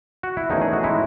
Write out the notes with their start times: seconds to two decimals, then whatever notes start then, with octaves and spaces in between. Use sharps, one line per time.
0.23 F#4
0.37 E4
0.50 E2 D#3 A3 C#4 D#4
0.61 G#4
0.73 F#4
0.83 A2 G#3 D#4 E4